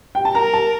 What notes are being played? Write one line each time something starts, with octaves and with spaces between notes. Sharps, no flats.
G5
A5
A#4 A#5
A5